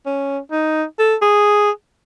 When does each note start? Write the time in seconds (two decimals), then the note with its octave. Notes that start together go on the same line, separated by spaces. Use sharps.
0.06 C#4
0.51 D#4
0.99 A4
1.22 G#4